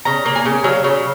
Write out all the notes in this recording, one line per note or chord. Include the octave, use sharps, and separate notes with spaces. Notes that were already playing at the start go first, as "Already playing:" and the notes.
C#3 A#5
A#3
G#5
C#3
F#3 F5
C#3